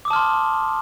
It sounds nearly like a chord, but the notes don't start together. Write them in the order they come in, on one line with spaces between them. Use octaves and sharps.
D6 D#6 A5 F6 C6